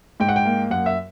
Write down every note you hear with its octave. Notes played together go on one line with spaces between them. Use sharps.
G#2 G5
F#5
G5
A#3
F#2 F#5
E5